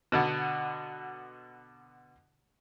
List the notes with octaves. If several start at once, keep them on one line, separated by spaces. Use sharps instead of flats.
B2 D3 B3